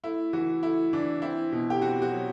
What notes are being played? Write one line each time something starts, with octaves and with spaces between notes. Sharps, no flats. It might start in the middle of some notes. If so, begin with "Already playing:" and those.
A3 E4
E3 F#4
A3 E4
E3 D4
C4 E4
B2
G4
C4 F#4
F#4
F#3